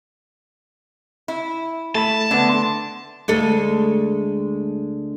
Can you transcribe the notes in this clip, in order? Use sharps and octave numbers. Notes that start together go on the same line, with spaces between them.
E4
A3 A5 B5
D3 A3 B3
C6
D2 G#3 A4